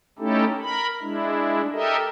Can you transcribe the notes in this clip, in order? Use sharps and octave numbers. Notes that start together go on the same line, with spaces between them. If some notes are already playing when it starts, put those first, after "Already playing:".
A3 C#4 D#4 E4 G4 A4
A#4 B5
G#3 D4 E4
G4 A4 A#4 D#5 E5